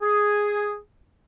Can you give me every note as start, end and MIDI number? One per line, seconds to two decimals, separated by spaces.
0.02 0.77 68